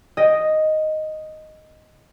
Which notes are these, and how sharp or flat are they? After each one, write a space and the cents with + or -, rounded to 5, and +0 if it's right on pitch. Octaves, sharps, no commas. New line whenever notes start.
D#5 +0 G5 +0